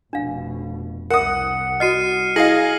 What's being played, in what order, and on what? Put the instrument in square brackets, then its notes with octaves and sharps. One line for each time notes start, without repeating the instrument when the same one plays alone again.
[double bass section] F1 B2 [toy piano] D4 F5
[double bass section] C2 [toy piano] A#4 E5 [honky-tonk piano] F#5 D#6 [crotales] C#7
[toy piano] F#4 D#5 [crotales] F6 C7 D#7
[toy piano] E4 [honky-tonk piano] G#4 D#5 F5 [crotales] A#6 C7 F#7